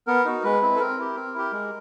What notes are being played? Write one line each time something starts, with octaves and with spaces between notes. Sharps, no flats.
B3 A#4
D#4 F#4
G#3 B4
C4 E4
A4
C4 A#4
E4 G4
C4
E4 G4
G#3